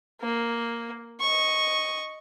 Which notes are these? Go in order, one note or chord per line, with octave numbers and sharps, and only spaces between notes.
A#3
D#5 C#6